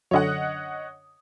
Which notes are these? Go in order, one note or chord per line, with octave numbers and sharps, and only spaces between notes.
F#2 D3 C#5 D#5 F#5